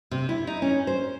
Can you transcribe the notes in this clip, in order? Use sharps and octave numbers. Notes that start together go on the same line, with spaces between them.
C3
E4
D#4
C#4
C5